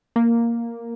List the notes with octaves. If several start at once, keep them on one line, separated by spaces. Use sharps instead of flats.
A#3